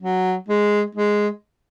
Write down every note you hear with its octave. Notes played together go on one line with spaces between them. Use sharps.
F#3
G#3
G#3